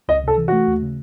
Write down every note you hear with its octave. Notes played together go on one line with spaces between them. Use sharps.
C#2 D#5
C3 A4
E3
A3 F#4
D#2
C#3